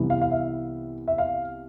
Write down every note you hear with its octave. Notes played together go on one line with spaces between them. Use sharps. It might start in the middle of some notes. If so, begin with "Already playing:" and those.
Already playing: C2 C3 E3 B3
F5
F5
E5
E5
F5